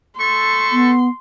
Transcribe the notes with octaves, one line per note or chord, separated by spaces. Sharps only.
A3 A4 C6 C#6
B3